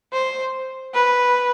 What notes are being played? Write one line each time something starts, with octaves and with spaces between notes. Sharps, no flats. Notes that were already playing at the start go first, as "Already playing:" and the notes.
C5
B4